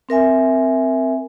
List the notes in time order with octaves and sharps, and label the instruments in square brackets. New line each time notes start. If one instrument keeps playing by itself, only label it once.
[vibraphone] C4 A#4 E5 G#5